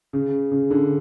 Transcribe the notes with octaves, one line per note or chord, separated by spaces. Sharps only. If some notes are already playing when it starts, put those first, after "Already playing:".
C#3
C#3
D3